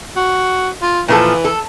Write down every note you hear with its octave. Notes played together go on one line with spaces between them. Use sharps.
F#4
F4
A#2 E3 F3 A4
A4